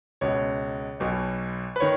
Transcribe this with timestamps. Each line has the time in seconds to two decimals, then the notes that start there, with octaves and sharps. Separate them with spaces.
0.21 C#2 B2 C#5
1.00 B1 B2
1.76 B4
1.80 D#3 C#5